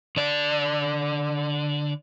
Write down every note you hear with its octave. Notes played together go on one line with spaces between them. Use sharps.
D3 D5